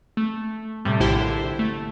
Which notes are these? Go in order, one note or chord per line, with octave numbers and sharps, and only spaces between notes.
A3
A2 C3 G3
A#1 D3 E4 G4 C5 G5
A3